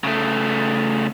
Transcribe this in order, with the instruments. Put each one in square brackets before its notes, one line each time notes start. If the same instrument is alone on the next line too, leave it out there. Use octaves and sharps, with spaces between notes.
[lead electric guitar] C#3 A3